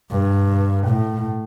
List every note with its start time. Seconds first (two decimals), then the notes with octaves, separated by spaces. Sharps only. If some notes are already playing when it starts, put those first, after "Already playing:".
0.11 G2
0.88 A2